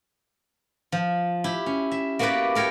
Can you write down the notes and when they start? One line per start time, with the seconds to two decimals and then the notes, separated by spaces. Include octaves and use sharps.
0.92 F3
1.44 E4 G4
1.66 C#4
1.91 E5
2.19 A#3 B3 F#4 G4 B4 D5
2.55 A4 A#4 C#5 G5